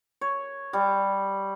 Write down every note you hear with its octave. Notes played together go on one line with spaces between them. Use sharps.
C#5
G3